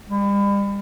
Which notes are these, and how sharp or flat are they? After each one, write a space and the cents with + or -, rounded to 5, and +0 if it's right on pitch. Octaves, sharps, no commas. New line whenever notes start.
G3 +40